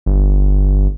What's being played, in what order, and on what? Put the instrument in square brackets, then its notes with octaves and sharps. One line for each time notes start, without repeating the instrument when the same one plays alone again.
[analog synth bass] G1